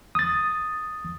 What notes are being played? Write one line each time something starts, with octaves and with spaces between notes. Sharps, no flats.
D#6 A6